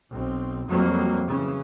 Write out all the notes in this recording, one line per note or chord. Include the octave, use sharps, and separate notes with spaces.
B1 C4
F2 F#3 G3 A#3
C#3 E3